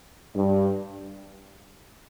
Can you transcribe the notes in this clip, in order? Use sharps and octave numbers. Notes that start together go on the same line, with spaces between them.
G2